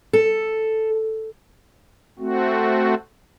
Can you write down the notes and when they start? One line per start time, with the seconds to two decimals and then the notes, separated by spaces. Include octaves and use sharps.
0.13 A4
2.19 A3 C4 F#4